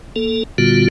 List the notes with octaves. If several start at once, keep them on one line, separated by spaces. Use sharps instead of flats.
A#3 A4
A#2 D3 G3 B3 F4 F#4